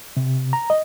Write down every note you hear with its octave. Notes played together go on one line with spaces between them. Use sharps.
C3
A#5
D#5